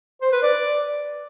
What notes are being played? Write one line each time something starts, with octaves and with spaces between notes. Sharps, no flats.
C5
B4
D5